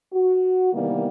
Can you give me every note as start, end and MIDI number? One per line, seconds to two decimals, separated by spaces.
0.13 0.73 66
0.73 1.08 48
0.73 1.08 51
0.73 1.08 52
0.73 1.08 55
0.73 1.08 58
0.73 1.08 59